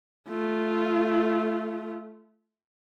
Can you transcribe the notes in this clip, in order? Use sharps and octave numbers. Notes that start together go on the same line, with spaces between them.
A3 F4